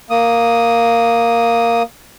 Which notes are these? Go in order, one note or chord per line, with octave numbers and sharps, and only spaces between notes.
A#3 D#6